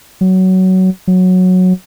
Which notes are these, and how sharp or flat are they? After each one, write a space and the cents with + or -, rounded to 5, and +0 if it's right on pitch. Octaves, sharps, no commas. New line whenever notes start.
F#3 +15
F#3 -10